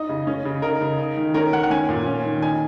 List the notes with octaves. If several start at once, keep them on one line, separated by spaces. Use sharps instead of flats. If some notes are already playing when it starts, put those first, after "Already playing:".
Already playing: D#4 D#5
C#3
C#4
C#3
D#4 A#4
C#3
D#4
D#3
C#4 A#4
D#3 F#5
F#5
C#4 G#5
A#2
C#4
D#3
D#4 G#5